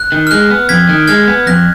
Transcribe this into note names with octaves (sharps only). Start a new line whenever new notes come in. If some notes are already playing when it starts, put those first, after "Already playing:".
Already playing: F#6
D#3
F6
G#3 F#6
B3
F2 G#6 B6
D#3
G#3 F6 G#6
B3
F2 F#6 A#6